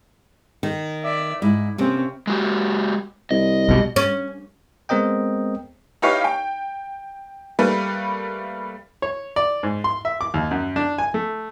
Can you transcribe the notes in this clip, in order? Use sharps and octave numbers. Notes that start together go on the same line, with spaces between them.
D#3
D5 E5
G#2 E4
C3 A#3 C4 C#4
G#3 F#4 G4
C2 D#5
B1 B2 G3
C#4
G#3 B3 C4 A#4 D#5 G5
D#4 E4 G4 B4 C#5 F5
G5
G3 A3 A#3 B4
C#5
D5
G#2
C6
E5
D6
D#2
F#2
D4
G#5
A3